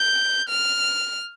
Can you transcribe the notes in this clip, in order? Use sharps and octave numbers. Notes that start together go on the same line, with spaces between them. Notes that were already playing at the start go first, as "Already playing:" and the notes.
Already playing: G6
F6